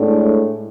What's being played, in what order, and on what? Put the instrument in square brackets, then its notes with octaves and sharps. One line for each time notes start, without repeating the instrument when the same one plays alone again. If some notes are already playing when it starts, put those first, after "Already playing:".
Already playing: [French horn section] A2 G#3 D4